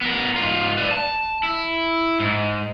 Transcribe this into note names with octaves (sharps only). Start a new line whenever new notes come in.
B3 A#4
G#2 F4
B4 D5
A5
E4
G#2